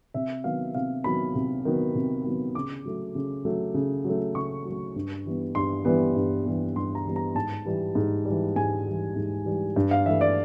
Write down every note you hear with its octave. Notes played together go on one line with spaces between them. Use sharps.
C3 E5
D#3 F#3 B3 F5
C3 F5
D#3 F#3 B3 B5
C3
D#3 F#3 B3
C3
D#3 F#3 B3
C#3 D6
F#3 A3
C#3
F#3 A3
C#3
F#3 A3
C#3 C#6
F#3 A3
G2
E3 G3 B3
G2 C6
E3 G3 B3
G2
E3 G3 B3
G2 C6
A#5
E3 G3 B3
A#5
G#2 A5
E3 G3
G#2
E3 G3
G#2 G#5
E3 G3
G#2
E3 G3
G2
F5
E3 A3 E5
D5